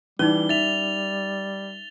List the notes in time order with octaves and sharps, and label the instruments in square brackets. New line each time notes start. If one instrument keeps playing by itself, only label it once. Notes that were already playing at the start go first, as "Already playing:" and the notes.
[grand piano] E3 [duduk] G3 [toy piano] C#4 D#4 [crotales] G7
[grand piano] E5 [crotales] A6 F7